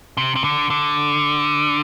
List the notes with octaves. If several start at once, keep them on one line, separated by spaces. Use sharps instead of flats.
C3
C3
D3
D3